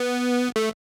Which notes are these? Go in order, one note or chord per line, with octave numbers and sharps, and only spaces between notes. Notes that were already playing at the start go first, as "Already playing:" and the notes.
Already playing: B3
A3